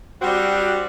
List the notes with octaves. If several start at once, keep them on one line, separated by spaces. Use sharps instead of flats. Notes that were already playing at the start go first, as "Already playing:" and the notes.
G3 C4 D4 F#4